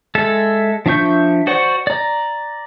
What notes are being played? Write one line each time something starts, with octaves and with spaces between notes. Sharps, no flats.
G#3 A4 E5
F3 D4 E5 C#6 G6
F#4 C5 D5 F#5 C#6
D5 A#5